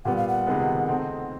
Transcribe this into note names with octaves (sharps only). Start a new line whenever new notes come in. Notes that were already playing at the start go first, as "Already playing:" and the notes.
A#2 G3 B3 F#5
F5
F#5
C#2 C3 D#3 G#3 B3
A3 C4 D#4